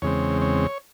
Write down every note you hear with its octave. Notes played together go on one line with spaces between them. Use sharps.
E2 C#3 G#3 C4 C#5
C#5